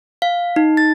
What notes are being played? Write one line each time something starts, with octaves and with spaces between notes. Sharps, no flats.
F5
D#4
A6